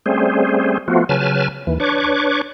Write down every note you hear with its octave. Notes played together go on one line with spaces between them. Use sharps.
G3 A3 C4 C#4 G#4 C5
F3 A3 B3 F4 F#4
C#3 F#3 B4 G#5 A5 F6
D#2 E3
D4 B4 C#5 C#6 D6